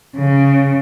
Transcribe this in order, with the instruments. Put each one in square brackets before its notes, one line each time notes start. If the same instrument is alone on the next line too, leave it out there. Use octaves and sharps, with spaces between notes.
[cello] C#3